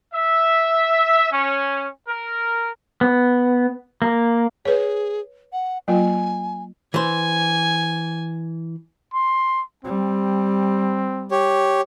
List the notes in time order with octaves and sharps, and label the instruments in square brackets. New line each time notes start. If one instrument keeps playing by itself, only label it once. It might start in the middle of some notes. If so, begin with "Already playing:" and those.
[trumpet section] E5
C#4
A#4
[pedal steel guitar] B3
A#3
[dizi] G#4 [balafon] B4 C#5
[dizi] F#5
[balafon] F#3 A#3 F4 [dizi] G#5
[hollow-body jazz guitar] E3 C5 [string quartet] G#5
[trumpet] C6
[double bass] G3 [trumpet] C4
[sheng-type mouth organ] G4 C#5